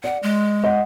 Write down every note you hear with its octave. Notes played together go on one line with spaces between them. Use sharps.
D5 F#5
G#3
D#5 F#5